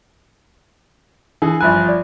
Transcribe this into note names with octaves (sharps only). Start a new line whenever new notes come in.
E3 G#4
G1 F3 E5 G#5 B5 F#6
D5